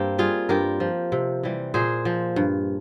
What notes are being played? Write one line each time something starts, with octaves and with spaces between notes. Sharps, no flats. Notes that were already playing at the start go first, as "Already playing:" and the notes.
Already playing: G2 A#3 C4 G4
G3 F4 G#4
G2 G4 A#4
F3
C3
E3 G3
A#2 G#4 C5
F3
G2